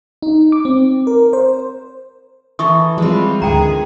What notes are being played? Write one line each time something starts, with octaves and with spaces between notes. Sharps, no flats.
D#4
D6
C4
A#4
C5
E3 A4 A#5 C#6 D#6
F3 G3 G#3 C4 F4 B4
D2 G#2 D3 D#3 G#4 G5 A#5